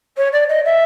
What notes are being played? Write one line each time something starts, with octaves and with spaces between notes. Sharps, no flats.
C#5
D5
D#5
E5